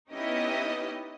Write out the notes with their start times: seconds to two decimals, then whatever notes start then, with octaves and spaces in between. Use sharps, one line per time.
0.13 B3 C#4 D#4 E4 G4 D#5